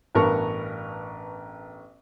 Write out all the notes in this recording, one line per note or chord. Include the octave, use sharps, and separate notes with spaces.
A1 G2 B3 A#4 A5 C#6